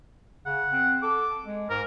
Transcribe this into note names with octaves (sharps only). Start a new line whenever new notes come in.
C#3 F#5
C4
A4 D6
G#3
G#2 A#4